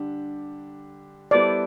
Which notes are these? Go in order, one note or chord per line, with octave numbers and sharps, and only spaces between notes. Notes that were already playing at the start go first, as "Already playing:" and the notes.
Already playing: D3 G3 D4 G4
G3 B3 E4 A4 C5 D5